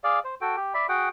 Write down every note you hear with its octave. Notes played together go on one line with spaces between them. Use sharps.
G#4 D5 F5
C5
F#4 A4 G5
G4
D5 E5 B5
F#4 G#4 F#5 G5